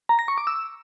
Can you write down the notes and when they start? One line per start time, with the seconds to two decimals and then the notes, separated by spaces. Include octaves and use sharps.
0.09 A#5
0.19 A#6
0.28 C#6
0.38 D6
0.47 E6